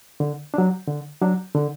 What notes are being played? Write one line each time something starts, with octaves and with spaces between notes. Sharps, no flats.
D3
F#3 D4
D3
F#3 D4
D3